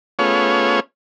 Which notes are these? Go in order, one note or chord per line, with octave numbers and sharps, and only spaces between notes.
A3 B3 C#4 F4 G#4 C#5